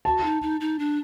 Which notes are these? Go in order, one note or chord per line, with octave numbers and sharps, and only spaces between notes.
F#4 A5
D#4
D#4
D#4
D4